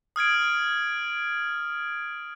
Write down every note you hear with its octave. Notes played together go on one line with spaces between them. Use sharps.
D#6 F6 G#6 D7